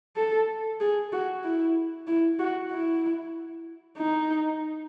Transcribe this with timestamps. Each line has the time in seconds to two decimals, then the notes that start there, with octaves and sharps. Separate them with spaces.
0.16 A4
0.80 G#4
1.12 F#4
1.44 E4
2.07 E4
2.39 F#4
2.71 E4
3.97 D#4